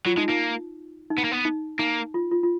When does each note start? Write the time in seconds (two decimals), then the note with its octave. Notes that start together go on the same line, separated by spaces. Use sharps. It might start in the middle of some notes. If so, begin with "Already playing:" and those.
0.06 F#3 F4
0.17 G#3 D#4
0.28 A#3 D#4
1.10 D#4
1.18 B3
1.24 A#3
1.32 B3
1.45 D#4
1.79 A#3 D#4
2.14 F4
2.31 F4
2.43 F4